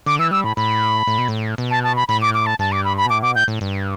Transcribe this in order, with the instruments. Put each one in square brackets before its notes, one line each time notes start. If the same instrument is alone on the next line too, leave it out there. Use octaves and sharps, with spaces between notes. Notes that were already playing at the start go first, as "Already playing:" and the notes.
[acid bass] D3 [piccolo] D6
[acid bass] E3 [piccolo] E6
[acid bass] G3 [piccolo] E6
[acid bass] A2 [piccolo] B5
[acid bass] A2 [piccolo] B5
[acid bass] A2
B2
A2
B2
[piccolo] A5
A5
B5
[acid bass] A2 [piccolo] B5
[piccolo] D6
D6
A5
[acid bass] G2 [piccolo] A5
[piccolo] D6
B5
B5
[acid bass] B2
[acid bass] A2 [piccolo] D6
[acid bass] B2 [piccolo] D6
[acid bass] A2 [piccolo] G6
[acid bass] A2
G2